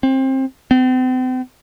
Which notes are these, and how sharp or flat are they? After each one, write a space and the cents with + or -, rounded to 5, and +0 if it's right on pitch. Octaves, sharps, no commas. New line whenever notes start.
C4 +25
C4 -40